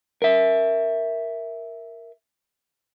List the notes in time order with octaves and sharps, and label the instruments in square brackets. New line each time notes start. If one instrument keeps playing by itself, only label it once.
[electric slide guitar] A#4 E5